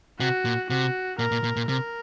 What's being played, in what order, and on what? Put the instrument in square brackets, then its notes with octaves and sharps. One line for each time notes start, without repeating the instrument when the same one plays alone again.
[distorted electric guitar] C3 [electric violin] F#4
[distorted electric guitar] A#2
[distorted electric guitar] C3 [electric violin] F#4
[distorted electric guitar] A#2 [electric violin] A#4
[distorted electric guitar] A#2
A#2
A#2
[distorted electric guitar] C3 [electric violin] A#4